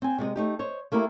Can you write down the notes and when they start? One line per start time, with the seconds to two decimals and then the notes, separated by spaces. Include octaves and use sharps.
0.02 C4 G#5
0.18 C3 G#3 D5 D#5
0.36 A3 D#4 G4
0.59 C5 C#5 D#5
0.92 A3 A#3 E4 G4 A#4